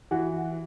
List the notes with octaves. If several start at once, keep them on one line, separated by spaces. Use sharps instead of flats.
E3 F#4